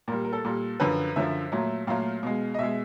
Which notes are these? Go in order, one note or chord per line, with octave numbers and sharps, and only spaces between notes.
A#2 G3 A#4
A#4
A4
A#2 G3
F#2 D3 F3 B4
F#2 D3 F3 E5
A#2 F#3 A3
A#2 F#3 A3 F5
B2 G#3
D#5
B2 G#3 E5